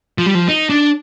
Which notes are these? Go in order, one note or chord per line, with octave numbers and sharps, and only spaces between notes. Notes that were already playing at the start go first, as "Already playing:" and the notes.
F3
G3
F3
D#4
D4